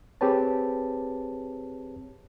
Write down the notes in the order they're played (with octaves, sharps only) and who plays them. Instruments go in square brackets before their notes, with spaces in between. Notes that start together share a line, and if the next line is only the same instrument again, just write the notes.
[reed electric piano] C4 G4 G#4 B4 C#5 A5